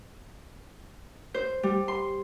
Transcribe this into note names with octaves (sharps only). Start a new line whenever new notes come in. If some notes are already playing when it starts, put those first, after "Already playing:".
C5
G3
C6